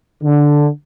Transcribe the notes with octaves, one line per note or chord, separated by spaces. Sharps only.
D3